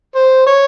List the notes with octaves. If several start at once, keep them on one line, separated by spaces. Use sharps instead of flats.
C5
C#5